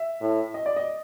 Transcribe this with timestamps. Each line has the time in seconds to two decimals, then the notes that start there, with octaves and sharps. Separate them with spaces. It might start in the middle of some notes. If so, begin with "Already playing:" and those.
Already playing: E5
0.21 A2
0.54 D#5
0.66 D5
0.76 D#5